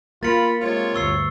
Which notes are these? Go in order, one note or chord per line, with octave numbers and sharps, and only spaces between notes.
A#3 F4 B5 A6 C#7
C3 G#3 F4 C#5
D2 G2 C#6 E6 C7